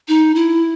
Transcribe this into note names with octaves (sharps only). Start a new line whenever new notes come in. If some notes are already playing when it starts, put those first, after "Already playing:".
D#4
E4